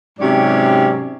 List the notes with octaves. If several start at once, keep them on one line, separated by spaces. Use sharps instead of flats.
G#2 C3 F#3 C#4 G4 D5